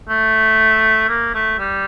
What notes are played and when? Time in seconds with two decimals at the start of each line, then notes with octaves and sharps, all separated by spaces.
0.09 A3
1.09 A#3
1.35 A3
1.59 G3